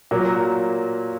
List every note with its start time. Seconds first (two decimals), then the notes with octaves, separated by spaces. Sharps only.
0.11 A#2 F#3 A#3